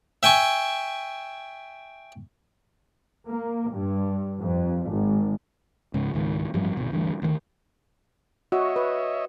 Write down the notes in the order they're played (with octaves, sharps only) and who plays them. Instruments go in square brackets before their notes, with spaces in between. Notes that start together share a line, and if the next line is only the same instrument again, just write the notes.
[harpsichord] E5 G5 G#5 C#6
[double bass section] A#3
G2
F2
G#1
[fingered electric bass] C#2 G#2 C#3
C#2 G#2 D#3
A1 G2 F3 G3
D1 G#1 B2
D2 G2 E3
D2 D#3
[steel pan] F#4 [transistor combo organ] C#5 D#5 E5
[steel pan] B4